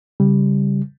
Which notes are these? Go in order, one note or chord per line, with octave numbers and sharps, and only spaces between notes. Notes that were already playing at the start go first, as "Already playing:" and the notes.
C#3 G3